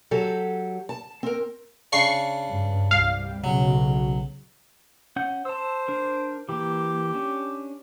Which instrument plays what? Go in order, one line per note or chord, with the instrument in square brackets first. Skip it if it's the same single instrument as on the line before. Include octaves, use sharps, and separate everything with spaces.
[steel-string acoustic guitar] F#3 G4 A4
A5
C4 A#4
[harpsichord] C#3 D4 [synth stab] C#6 C7
[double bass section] G2
[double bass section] C2 G3 [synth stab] F5
[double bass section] B1 C#3 [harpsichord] F#3
[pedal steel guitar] C#4 F#5 G6
[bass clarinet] C5 [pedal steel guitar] A5 E6
[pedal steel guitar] D4 A#4
[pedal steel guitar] E3 A#3 [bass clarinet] G4
[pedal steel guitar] C#4 D4